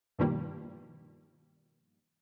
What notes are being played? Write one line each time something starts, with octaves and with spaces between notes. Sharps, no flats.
G2 B2 D#3 F3 G3 A#3